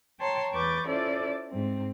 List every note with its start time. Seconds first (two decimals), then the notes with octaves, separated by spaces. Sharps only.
0.19 C#5 G5 A5 A#5 C6
0.52 E2 B4 C#6 D6 G6 A6
0.87 C#4 E4 F4 A4 C5 D5
1.49 G#2 C4